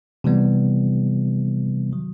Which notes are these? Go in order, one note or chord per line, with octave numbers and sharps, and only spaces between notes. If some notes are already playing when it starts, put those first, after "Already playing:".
C3 E3 G3 B3
D#3 F#3